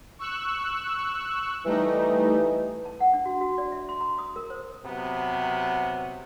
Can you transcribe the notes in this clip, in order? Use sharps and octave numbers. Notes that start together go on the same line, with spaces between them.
C#6 E6 F#6
E3 G3 A3 D#4
A5
F#5
D4
F#4
F#4
D5
E5
C6
A#5
D#6
A#4
C5
C3 F#3 B3